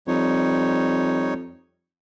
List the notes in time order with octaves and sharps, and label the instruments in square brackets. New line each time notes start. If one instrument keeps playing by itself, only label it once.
[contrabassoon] F2 [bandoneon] G3 D#4 C#5